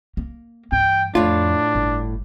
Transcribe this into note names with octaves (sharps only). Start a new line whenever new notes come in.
A#3
G2 E3 G5
F2 A2 D4 F4
G1